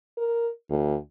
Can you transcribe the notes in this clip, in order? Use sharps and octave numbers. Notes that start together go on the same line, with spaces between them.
A#4
D2